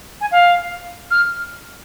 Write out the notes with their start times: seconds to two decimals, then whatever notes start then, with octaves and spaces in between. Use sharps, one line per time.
0.21 G#5
0.31 F5
1.11 F6